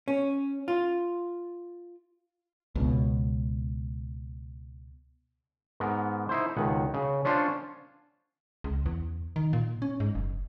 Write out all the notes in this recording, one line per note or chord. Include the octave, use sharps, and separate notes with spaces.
C#4
F4
C#2 B2
G#2 B3 A#4
D#4 E4 C5
C#2 B2 D#3 F#5
C#3
C#4 D4 F4 C5 C#5
C#2
E2
D#3
A#2
C#4
G#2
F#1